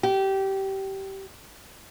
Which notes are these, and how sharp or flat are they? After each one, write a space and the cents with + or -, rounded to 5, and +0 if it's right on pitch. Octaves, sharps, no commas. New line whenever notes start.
G4 -20